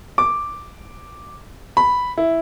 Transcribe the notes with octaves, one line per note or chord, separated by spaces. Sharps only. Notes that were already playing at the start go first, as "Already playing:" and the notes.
D6
B5
E4